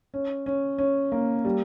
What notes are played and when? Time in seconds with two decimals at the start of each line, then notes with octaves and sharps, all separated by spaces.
0.14 C#4
0.46 C#4
0.78 C#4
1.12 A#3
1.45 G3